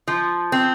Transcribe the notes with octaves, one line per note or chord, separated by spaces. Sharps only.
F3
C4